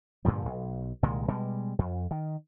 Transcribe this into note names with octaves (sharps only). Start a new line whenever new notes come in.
G2 A#2 D3 F3
B1
C2 A#2 D#3 G#3
B2 G3 G#3
F2
D#3